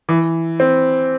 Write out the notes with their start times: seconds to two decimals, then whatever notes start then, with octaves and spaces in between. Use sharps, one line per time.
0.09 E3
0.60 C4